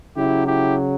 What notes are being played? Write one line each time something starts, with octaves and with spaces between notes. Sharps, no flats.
C#3 F#3 E4 G4
E4 G4